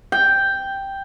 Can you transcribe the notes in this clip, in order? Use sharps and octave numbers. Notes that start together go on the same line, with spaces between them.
G5